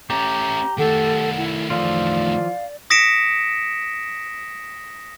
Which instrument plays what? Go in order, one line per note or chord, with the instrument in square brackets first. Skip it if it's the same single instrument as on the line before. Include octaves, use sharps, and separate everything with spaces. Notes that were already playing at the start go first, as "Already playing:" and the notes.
[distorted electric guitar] A3 C#4 [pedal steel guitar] G4 [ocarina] A#5
[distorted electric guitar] D#3 A3 [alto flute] A4 [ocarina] F#5
[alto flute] E4
[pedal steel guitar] E3 F3 F4 [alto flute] D5 [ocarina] F5
[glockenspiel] D#6 A#6 B6 C#7 D7 E7